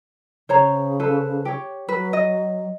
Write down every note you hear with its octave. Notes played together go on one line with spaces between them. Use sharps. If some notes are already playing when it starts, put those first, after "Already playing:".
C#3 C5 C#5 A#5
A4 B4 C5
G4 C#5
F#3 B4
D#5